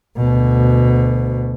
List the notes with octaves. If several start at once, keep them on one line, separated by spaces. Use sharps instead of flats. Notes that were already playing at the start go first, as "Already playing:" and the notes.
D2 B2